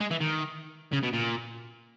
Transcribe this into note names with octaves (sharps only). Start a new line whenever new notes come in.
G#3
E3
D#3
C#3
B2
A#2